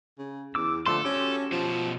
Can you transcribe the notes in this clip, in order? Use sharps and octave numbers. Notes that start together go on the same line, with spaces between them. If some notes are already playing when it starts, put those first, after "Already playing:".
C#3
E2 D6 E6
D3 F3 A3 A4 C6
C#4 F#4 G4
B2 F3 C5